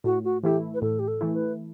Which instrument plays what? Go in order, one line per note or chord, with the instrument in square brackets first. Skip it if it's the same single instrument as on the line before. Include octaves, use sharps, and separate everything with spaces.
[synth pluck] A2 [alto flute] F#4
[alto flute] F#4
[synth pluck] E3 A3 E4 [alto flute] G4
[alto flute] B4
[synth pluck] A2 [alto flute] A4
[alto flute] G4
A4
[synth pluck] E3 A3 E4
[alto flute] B4